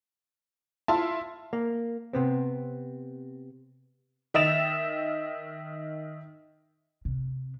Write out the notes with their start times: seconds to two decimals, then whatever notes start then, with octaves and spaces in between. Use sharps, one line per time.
0.88 E4 F4 A5 C6
1.53 A#3
2.13 C3 B3 C4
4.34 D#3 D#5 E5 A6 E7 F7
7.05 C3